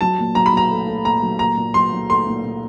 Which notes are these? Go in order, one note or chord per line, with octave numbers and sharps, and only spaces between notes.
F#3 A5
A#2
F#3 A#5
B5
F#3 A#5
A3
A3
A#2 A#5
F#3
A#2 A#5
A#2
F#3 C6
F#3
A3 C6
A#2
A#2